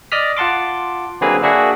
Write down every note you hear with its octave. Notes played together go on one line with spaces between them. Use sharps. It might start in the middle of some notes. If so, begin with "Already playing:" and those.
D5 D#5 D#6 F6 B6
F4 F#5 A5 C6 D6
D3 F#3 A#3 C4 G#4 B4
A#3 D4 F#4 G#4 E5 F#5